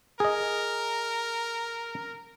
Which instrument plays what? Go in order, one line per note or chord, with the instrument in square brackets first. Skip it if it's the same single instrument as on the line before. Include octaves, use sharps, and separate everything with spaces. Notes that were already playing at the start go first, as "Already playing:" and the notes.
[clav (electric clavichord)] G#4 D#5 [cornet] A#4